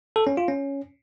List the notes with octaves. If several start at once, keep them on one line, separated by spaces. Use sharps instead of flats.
A4
C#4
F4
C#4